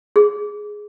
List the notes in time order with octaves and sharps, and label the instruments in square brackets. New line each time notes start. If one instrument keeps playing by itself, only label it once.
[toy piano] G#4